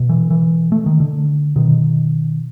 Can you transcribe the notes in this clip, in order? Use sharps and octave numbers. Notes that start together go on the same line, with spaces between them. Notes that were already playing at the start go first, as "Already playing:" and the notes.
Already playing: B2
E3
E3
A3
D#3
D3
B2 D#3